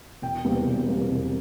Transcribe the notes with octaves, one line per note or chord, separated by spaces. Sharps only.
E1 G5
E2 C3 G3 A#3
E1
E2 C3 G3 A#3
E1